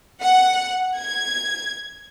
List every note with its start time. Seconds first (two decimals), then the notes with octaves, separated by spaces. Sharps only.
0.21 F#5
0.99 G#6